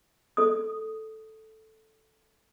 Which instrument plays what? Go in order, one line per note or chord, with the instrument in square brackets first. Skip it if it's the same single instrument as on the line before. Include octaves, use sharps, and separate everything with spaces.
[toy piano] A4 D#6